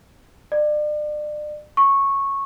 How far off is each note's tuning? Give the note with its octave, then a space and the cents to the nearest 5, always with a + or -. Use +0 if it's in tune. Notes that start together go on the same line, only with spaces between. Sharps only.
D5 +35
C#6 -10